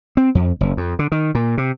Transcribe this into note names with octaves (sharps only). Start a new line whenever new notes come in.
C4
F2
F#1
F2
D3
D#3
A#2
C3